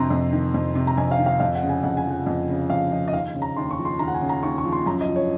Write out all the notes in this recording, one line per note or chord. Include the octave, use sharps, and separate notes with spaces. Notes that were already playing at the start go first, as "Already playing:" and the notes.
Already playing: F2 C3 A#5 C6
F2
D#3
F2
C3
A#5
F2 G#5
F5
D#3
F5
F2 F5
F#5
C#3
G#5
F2 F#5
G#5
F3 F#5
F2
C#3
F2 F5
F3 D#5
D#5
D#2 F5
C#3
A#5
D#2 C6
C#6
F3
C6
D#2 A#5
F#5
G#5
C#3
A#5
D#2 C#6
C#6
F3
C6
F#2 A#5
D#5
F3
C#5